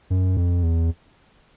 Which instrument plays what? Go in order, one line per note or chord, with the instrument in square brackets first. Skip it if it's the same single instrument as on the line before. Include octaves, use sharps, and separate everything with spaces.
[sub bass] F#2
F2
E2